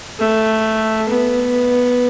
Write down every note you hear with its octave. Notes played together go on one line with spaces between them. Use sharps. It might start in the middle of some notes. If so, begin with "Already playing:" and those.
A3
B3